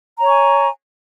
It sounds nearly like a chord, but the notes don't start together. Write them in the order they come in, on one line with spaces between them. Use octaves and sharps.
A#5 C#5 C#6 G#5